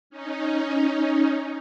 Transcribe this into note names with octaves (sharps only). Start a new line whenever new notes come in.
C#4 D#4